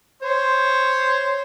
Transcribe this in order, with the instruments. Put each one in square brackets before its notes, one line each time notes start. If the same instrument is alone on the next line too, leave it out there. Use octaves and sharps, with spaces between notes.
[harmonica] C5 C#5